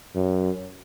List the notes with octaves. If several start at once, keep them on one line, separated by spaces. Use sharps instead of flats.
F#2